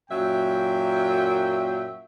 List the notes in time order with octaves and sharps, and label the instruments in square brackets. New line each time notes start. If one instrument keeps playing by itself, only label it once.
[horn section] F#2 A#2 F#3 E5 G5